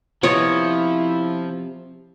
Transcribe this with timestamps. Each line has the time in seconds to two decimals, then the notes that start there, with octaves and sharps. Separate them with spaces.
0.23 C3 F3 B3 E4 C#5 D#5